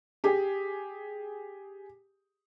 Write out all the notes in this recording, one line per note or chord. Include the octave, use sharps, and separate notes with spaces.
G4 G#4